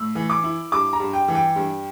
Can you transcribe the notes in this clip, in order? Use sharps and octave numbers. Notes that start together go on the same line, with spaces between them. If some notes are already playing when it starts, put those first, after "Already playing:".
Already playing: A2 E6
E3
D6
E4
G2 D6
A#5
G2
G5
E3
G5
G2